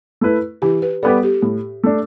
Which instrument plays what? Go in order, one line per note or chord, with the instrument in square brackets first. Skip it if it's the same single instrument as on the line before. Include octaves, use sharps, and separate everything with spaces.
[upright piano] A3 E4 B4
[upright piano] E3 [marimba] G4
[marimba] B4
[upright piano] G3 B3 G4 [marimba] A4
[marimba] G4
[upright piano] A2
A3 D4